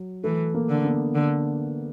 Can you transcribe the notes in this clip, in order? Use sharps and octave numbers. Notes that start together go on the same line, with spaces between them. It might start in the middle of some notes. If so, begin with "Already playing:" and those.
Already playing: F#3
E3 A3
A#3
D3
B3
D3